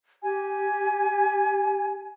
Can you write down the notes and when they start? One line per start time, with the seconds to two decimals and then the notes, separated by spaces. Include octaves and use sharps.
0.23 G4 G#5